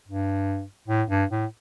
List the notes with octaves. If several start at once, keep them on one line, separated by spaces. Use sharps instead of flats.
G2
A2
G2
A2